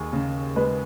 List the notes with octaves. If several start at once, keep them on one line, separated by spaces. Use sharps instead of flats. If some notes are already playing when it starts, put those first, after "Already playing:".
Already playing: D#2 G#4
C#3
G#3 B4